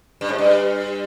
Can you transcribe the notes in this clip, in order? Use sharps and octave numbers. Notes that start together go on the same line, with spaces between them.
G2
G#2
G2